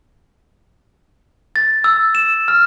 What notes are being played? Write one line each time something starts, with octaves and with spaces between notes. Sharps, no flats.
A6
E6
E7
F6